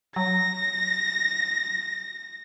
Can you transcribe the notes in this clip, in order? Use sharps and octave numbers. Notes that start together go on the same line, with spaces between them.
F#3 A#6